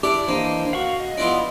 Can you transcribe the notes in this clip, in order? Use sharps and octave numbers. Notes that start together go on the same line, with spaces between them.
D4 E4 G4 D6
E3 A#3 D4 C5 D#5
F#4 F5 F#5 C#6
D#5
B3 D4 E4 F4